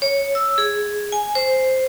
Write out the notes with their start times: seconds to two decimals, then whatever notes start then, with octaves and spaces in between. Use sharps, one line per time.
0.02 C#5
0.35 E6
0.58 G#4
1.12 G#5
1.35 C5